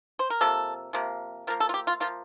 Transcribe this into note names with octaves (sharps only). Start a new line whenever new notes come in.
C5
A#4
C3 F3 A#3 A4
C3 F3 A#3
F3 A#3 A#4
A4
F4
G4
F4
F3 A#3 F4